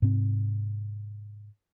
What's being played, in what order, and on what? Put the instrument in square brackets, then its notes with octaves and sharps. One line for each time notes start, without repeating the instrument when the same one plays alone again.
[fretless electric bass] G#2 C3 C4